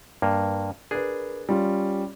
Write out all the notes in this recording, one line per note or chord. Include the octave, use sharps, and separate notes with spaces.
G2 A#3
D4 G#4 A#4 B4
G3 C#4 F4